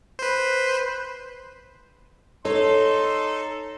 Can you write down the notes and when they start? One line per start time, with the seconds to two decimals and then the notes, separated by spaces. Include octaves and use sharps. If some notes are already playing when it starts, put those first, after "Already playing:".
0.19 B4 C5
2.45 D#4 A4 C#5 C6